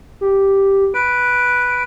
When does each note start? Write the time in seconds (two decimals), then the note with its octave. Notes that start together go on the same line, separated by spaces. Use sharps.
0.21 G4
0.94 B4 D7